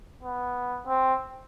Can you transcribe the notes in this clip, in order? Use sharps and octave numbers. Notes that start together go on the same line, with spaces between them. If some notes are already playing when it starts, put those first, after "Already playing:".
B3
C4